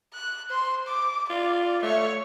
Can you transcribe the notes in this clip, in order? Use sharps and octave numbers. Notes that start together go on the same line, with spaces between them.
F#6
C5 C6
D6
F4 D5
A3 C#5